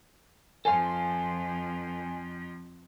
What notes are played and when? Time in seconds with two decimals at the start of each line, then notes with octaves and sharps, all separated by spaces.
0.65 F2 F3 A4 C5 F5 G#5